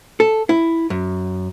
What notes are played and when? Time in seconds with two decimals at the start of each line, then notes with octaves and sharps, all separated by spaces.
0.20 A4
0.49 E4
0.90 F#2